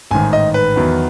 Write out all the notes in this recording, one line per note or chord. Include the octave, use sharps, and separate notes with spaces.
A1 G#2 D#3 G#5
D#5
B4
E2 D#3 F#3 B3